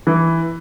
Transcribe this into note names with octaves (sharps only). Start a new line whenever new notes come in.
E3